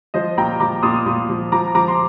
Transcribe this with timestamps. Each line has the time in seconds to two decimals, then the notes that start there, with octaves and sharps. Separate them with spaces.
0.14 F3 C5 D#5
0.37 A#2 G5 A#5
0.60 F3 A#5 D6
0.83 A#2 C6 D#6
1.06 A#2
1.29 F3
1.52 F3 A#5 D6
1.75 F3 A#5 D6
1.88 C6